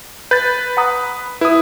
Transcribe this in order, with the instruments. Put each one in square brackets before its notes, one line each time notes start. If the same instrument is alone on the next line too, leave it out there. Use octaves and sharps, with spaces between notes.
[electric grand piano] B4 [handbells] G6 A6
[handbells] F#5 A#5 D#6
[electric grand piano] E4 D#6 [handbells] B4